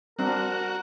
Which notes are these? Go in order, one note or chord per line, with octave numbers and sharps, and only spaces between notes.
G3 C4 D4 F#4 A#4